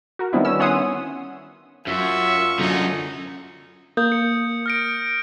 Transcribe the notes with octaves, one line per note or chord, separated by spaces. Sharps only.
F#4 A#4
D#3 G3 B3 C4 D4 E4
C#4 E6
C#5 E5 F#5 G#5 C6 D#6
F#2 F4 E5 C#6
F#2 D3 D#4
A#3 D#6 G6
C#7
F6 A#6 D7